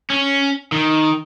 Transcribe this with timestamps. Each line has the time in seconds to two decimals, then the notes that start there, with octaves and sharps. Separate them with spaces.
0.10 C#4
0.72 D#3